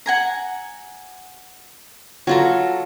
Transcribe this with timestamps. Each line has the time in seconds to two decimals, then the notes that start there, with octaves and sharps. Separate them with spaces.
0.06 F#5 G#5 A#5
2.27 F#3 F4 F#4 A4 A#5